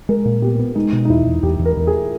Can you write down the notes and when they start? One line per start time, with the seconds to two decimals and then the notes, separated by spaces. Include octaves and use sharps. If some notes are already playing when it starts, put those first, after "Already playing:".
0.09 G#3 A#4
0.25 A#2
0.42 B3 G4
0.59 B3
0.75 G#3 D#4
0.93 B2
1.05 D#4
1.09 E2 E4
1.26 E2
1.43 E2 G4
1.59 E2
1.65 A#4
1.77 E2
1.87 G#4